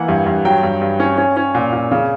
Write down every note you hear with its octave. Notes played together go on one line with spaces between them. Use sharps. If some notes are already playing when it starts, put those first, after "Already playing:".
Already playing: E3 A#3 F#5
G2
G2
F#3 G5
G2
G2
C#4
C#4
C#4
A#2
A#2
C#3